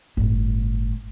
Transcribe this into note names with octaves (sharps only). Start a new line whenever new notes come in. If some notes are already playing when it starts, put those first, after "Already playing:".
G1 A2